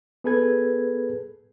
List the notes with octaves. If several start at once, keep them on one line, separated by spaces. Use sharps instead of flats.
B3 G#4 A4 B4 G#6